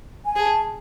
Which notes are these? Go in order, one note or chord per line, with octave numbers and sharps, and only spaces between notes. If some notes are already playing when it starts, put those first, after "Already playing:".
G#5
G#4 A5